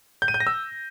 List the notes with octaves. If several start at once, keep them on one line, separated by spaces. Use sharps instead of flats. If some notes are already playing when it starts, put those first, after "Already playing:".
G6
D#7
G6
A#6
E6